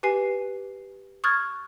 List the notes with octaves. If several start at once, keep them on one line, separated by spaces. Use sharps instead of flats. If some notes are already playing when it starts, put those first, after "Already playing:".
G4 B4 G#5 C7
C#6 D#6 F6 F#6 G#6 A6